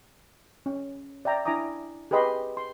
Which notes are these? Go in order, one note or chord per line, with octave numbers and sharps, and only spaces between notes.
C#4
D5 E5 G5 A#5
D4 E4 G#5 A#5 D6 D#6
G4 G#4 B4 D#5 B5 C6
C6